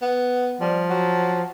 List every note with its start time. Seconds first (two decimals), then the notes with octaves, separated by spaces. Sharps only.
0.02 B3
0.61 F3 G3
0.90 F#3